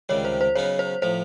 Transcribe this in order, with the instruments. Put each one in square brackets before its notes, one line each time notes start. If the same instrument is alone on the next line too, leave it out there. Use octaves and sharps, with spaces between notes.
[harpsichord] C#2 C3 D#3 G3 [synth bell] C#5
[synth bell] C5
C5
[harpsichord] C#3 F#3 B3 D#4 [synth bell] C#5
[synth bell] C5
[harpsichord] A2 F3 [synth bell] C5